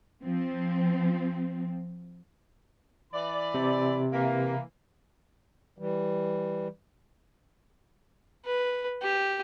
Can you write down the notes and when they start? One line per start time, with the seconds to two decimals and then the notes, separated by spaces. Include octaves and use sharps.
0.22 F3 C4
3.13 E3 D5 B5
3.54 C3
4.12 E3 A#3
5.79 E3 G3
8.46 B4
9.02 G4